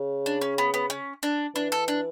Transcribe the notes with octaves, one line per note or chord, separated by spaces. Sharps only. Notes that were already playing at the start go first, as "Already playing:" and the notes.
Already playing: C#3
D4
C#4
B3
B3
C#4
D4
E3 D4
A4
D4